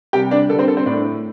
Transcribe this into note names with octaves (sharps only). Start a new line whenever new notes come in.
C3 G3 G4 G5
D4 D5
D3 G3 C4 A4 C5
A4
C4 C5
A2 A3 D4 D5